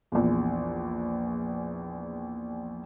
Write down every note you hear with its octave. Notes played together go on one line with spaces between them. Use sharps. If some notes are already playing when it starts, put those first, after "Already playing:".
A#1 E2